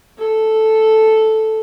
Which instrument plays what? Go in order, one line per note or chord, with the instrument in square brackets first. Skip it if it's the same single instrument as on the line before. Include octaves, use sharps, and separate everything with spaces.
[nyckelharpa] A4